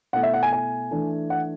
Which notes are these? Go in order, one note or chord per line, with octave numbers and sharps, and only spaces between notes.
B2 A3 E4 F#5
E5
F#5
G#5
G#5
E3 A3 D4
F#5